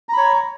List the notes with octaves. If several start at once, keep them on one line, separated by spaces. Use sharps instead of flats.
C#5 A#5 B5